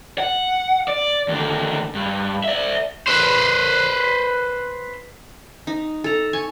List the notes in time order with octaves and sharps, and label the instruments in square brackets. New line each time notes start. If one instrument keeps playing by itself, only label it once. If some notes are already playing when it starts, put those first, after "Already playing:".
[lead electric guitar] F#5
D5
D#2 D3
G2
D5 E5
[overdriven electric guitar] B4 C5
[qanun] D#4
A4 A#5
G#5 C#6